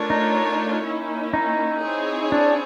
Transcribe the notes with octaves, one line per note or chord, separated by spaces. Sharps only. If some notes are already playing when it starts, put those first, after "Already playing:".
Already playing: A3 D4 F4 A#4 C#5
D#4
A#3 C#4 E4
D#4
C4 E4 G#4 C#5
D4